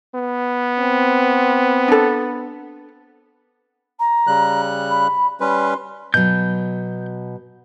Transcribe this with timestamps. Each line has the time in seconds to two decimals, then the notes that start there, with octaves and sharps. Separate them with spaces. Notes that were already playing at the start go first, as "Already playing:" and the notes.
0.15 B3
0.80 C4
1.88 D4 A4
3.99 A#5
4.27 C#3 G3 F#6
4.90 B5
5.40 G3 C#4 B4 C6
6.14 B2 F#3 G6